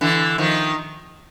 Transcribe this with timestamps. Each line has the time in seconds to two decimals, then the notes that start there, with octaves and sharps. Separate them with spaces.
0.01 D3 E3
0.38 D#3 F3